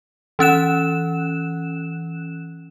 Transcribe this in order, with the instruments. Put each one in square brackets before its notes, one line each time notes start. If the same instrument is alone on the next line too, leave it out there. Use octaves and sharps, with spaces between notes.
[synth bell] E3 C#4 F#6 E7